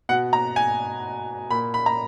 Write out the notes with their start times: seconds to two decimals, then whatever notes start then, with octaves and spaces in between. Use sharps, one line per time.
0.09 B2 F#5
0.33 A#5
0.56 G#5
1.50 A#2 B5
1.74 B5
1.86 A#5